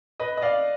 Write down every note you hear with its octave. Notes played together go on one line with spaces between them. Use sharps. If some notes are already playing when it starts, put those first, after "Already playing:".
B4 D#5
D#5
D5 F5